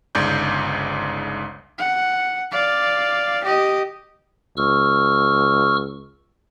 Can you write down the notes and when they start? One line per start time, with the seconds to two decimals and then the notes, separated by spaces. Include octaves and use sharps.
0.15 G1 C#2 G#2 D5 G6
1.78 F#5
2.52 D5 F5
3.44 G4 D#5
4.57 C#2 C#6 E6 F6